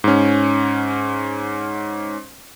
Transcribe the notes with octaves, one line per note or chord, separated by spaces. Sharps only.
G#2 C#4